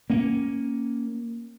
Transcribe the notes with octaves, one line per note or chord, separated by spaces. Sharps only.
A#3 C#4